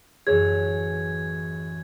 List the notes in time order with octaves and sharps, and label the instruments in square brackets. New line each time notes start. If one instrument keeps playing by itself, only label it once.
[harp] A1 F#2 E3 [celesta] G#4 C#5 [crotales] G#6